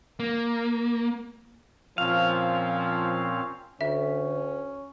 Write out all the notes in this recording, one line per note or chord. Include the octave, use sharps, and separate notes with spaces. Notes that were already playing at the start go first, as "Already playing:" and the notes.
A#3
A#2 F3 C4 C#4 F5
D2 D3 C#4 E5